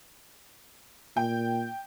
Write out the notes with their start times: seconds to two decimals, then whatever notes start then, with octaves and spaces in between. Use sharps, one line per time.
1.17 A#2 G5